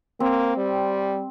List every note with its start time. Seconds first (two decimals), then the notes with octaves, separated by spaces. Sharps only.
0.20 A#3 C4
0.57 G3